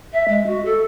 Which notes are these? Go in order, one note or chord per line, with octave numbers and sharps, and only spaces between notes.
E5
G#3
F#4
A4